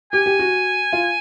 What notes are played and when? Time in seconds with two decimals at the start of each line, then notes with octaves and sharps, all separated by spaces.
0.13 G4 G#5
0.26 G4
0.39 F#4
0.93 F4